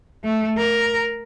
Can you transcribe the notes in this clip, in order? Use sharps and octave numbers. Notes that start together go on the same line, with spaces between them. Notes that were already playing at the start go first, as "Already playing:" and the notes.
A3
A#4